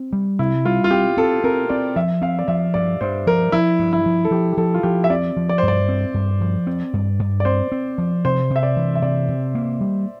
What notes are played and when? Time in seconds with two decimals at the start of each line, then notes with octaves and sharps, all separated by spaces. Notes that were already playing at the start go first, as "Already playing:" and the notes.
Already playing: C4
0.13 G3
0.39 C3 E4
0.65 G3 F4
0.84 F4
0.91 C4 G4
1.17 C4 A4
1.44 C4 A#4
1.70 C4 D5
1.96 F3 E5
2.22 C4 F5
2.39 D5
2.48 F3 E5
2.74 G2 D5
3.01 G2 C5
3.27 F3 A#4
3.52 F3 E4
3.79 G2
3.93 E4
4.06 F3
4.25 A4
4.31 F3 G4
4.53 G4
4.57 F3 A4
4.74 F4
4.83 F3 G4
5.04 E5
5.10 C4 D5
5.37 F3
5.49 D5
5.58 C5
5.63 G2
5.68 D5
5.89 C4
6.14 G2
6.41 F3
6.67 C4
6.93 G2
7.19 G2
7.40 D5
7.45 C4 C5
7.72 C4
7.98 F3
8.25 C3 C5
8.50 C3
8.56 E5
8.63 D5
8.77 E3
8.95 E5
9.02 C3 D5
9.28 C3
9.55 A#3
9.81 G3